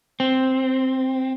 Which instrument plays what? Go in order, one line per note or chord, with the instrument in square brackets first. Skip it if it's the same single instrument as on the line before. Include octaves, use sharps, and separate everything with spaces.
[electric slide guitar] C4